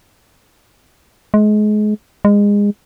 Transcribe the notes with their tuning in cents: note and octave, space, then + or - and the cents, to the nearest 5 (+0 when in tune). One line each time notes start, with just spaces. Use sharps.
G#3 +30
G#3 -25